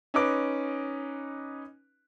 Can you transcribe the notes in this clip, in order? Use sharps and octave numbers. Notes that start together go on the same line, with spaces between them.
C#4 D#4 B4 D6